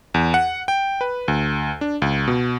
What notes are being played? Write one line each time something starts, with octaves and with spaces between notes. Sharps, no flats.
E2
F#5
G5
B4
D2
D4
C#2
B2